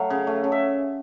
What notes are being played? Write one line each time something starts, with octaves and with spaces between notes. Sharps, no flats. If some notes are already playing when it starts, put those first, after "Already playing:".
Already playing: F#3 A3 F5
C#3
A3
C#3
E5